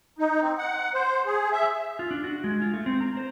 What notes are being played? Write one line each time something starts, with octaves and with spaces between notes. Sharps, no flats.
D#4
C4
F#5
C5
G#4
E5
F4
D4
F#4
G#3
F4
A3
C4
A#5
C5